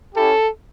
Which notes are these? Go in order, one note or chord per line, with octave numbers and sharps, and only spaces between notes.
C#4 E4 G4 A4